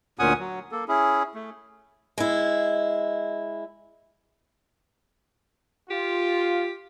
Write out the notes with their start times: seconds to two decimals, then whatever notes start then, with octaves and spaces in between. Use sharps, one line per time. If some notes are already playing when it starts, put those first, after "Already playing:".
0.19 D2 A#2 C#4 F#5 G#5 D#6
0.40 F#3
0.72 A#3 A4
0.88 C#4 E4 G#4
1.35 A3
2.18 G#3 E4
5.90 F4 G4